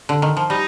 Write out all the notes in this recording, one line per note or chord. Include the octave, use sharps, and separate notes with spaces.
D3
D#3
F3
G3 D#4